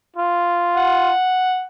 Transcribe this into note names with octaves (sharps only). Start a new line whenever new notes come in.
F4
F#5